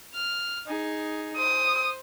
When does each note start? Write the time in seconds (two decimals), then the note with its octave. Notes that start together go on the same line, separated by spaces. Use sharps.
0.14 F6
0.67 D#4 G#4
1.37 C5 D#6